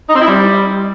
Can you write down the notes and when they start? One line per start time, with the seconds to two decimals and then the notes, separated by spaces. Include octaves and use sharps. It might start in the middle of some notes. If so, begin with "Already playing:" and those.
0.10 D#4
0.16 C4
0.22 E4
0.28 G3